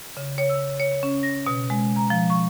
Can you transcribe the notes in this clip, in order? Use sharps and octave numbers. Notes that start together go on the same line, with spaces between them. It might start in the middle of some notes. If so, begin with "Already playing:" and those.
C#3
C#5
E6
C#5
C#4
A#6
B2
G#3
A#5
F3
C#6